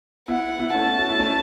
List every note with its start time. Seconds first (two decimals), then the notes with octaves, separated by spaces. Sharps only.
0.28 B3 E4 F#5
0.59 B3 E4
0.74 A3 C#4 A5
0.98 F#4
1.09 E4
1.19 A3 C#4